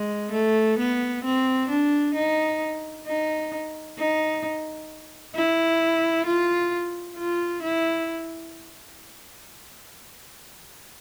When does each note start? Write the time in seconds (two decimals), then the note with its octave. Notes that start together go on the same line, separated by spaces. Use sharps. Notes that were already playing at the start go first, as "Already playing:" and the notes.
Already playing: G#3
0.32 A3
0.78 B3
1.24 C4
1.69 D4
2.14 D#4
3.07 D#4
3.98 D#4
5.35 E4
6.26 F4
7.17 F4
7.62 E4